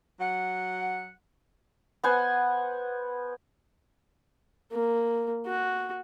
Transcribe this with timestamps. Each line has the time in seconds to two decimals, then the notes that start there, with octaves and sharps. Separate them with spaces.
0.19 F#3 F#5
2.03 B3 C5 F#5 G#5
4.72 A#3
5.47 F#4